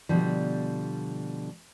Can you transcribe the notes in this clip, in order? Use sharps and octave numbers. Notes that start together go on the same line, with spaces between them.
B2 D3 F3 G3